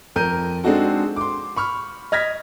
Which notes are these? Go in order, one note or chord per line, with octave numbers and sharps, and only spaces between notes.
F2 A#4 G6 D#7
G#3 C4 D4 D#4 F#4 A4
C6 D6
B5 C#6 F6
D#5 F6 G#6 A#6 B6